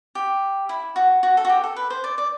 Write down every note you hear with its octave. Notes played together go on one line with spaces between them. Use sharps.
G4
E4
F#4
F#4
A4
F#4
G4
A4
B4
C5
D5
D5